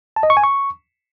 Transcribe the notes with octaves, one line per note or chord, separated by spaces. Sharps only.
A5
D#5
C#6
G#5
C#6